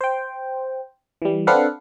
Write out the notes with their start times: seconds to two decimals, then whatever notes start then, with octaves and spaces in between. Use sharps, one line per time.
0.01 C5 G5
1.22 E3 G3
1.47 C4 D4 A4 B4 F5 F#5